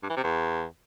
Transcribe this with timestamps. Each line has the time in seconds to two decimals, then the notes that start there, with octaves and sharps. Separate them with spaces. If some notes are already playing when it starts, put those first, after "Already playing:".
0.03 G2
0.10 E3
0.17 C3
0.23 E2